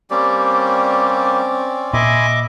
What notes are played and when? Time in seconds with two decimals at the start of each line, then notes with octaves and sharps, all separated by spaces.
0.10 G3 A#3 C4 C#4 G4 D5
1.93 A#2 D#5 E5 G#5 B5 C6 D6